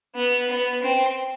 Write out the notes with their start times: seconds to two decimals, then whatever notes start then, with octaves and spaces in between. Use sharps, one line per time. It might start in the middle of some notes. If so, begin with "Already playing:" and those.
0.15 B3
0.50 B3
0.82 C4